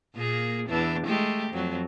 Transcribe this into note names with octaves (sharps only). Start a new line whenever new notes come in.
A#2 A#3 G#4
E2 E3 D4
G#3 A3 G4
F2 F#3